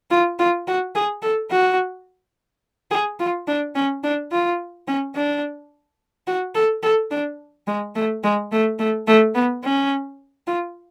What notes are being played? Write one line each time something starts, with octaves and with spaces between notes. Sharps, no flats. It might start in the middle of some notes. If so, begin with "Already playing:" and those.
F4
F4
F#4
G#4
A4
F#4
G#4
F4
D4
C#4
D4
F4
C#4
D4
F#4
A4
A4
D4
G#3
A3
G#3
A3
A3
A3
B3
C#4
F4